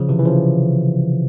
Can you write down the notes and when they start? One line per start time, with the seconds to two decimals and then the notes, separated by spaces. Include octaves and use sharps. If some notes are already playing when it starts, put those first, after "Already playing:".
Already playing: C#3 F3
0.09 C3 E3
0.19 E3
0.25 C#3 F3